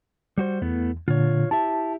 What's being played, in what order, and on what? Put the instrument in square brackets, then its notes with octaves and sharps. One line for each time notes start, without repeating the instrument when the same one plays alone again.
[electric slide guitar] G3 F#4 C5
[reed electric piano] E2 [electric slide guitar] A3 B3 E4
[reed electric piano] A#2 D3 [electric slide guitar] F4 C#5
[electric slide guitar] E4 G4 E5 [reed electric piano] A5